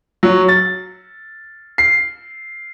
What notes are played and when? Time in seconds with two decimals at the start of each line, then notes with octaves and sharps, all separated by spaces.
0.23 F#3
0.48 A6
1.78 C7